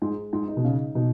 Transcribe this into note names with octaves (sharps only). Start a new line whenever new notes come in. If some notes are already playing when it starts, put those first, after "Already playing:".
G#2 G#3
G#2
D#4
B2
C#3
B2 D#4